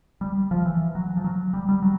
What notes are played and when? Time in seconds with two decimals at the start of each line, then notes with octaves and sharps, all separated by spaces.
0.21 G3
0.51 F3
0.66 E3
0.95 F#3
1.17 F3
1.24 F#3
1.54 G3
1.69 G3
1.82 F#3